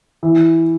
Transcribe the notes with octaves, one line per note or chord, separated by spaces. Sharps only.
E3